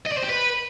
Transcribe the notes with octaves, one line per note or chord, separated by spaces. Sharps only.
D#5
D5
C5
G4
B4